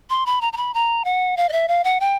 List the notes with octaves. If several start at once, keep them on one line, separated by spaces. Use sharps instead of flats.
C6
B5
A#5
A#5
B5
A#5
F#5
F5
D#5
E5
F5
F#5
G5